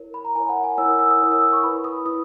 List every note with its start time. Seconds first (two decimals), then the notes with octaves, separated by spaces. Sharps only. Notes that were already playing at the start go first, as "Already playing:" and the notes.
Already playing: E4 A#4 C#5
0.14 B5
0.25 A#5
0.35 E4 A#4 C#5 G#5
0.49 F#5
0.64 G#5
0.78 E4 A#4 C#5 E6
0.89 D#6
0.99 E6
1.11 D#6
1.21 E4 A#4 C#5
1.32 E6
1.42 D#6
1.53 C#6
1.63 E4 B4 B5
1.84 D#6
2.06 E4 B4 D#6